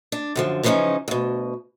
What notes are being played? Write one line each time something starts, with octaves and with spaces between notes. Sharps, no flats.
D4
F#2 D3 F3
C#3 E3 F3 A3 C#4 D#4
D2 B2